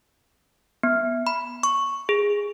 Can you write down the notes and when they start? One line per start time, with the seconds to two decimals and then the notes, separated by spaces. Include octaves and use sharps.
0.83 B3
1.27 B5
1.63 C#6
2.09 G#4